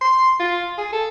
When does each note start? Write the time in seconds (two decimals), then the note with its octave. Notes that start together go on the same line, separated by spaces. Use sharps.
0.01 C6
0.40 F4
0.78 G#4
0.93 A4